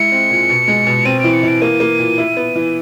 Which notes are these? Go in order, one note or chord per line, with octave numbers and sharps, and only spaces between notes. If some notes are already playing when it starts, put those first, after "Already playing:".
Already playing: G#3 E4 C#7
C4
A#2
B2
G#3
B2
C4 D#7
E3 D7
C#7
E3 D7
A#3 D#7
A#3
A#2
E4
B3
E3